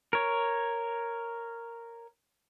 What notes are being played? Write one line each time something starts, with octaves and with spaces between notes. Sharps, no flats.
A#4 C#5